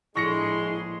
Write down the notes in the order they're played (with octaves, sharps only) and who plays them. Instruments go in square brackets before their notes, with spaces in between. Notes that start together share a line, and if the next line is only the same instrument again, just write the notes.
[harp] A#1 A2 [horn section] G#3 C6 [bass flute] E4 [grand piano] C#6 A#6 C#7